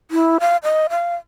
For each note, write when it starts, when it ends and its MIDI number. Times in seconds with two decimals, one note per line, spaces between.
0.11 0.38 64
0.40 0.57 77
0.63 0.87 75
0.90 1.15 77